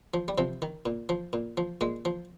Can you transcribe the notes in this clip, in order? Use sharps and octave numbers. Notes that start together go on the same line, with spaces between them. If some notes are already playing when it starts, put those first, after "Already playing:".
F3
G3
C3 F3
D#3
A#2
F3
A#2
F3
A#2 G#3
F3